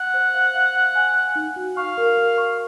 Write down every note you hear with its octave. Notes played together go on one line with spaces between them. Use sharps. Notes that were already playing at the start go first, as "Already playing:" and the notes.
Already playing: F#5
C5
F5
F5
F5
G#5
G#5
D#4
F#4
F5 C#6
A#4
A#4
C#6